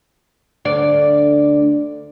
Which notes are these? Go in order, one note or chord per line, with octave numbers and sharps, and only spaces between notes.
D2 D5